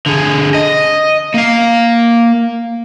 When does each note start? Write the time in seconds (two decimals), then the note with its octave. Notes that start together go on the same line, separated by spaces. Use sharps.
0.06 D3 G#4
0.54 D#5
1.34 A#3 F5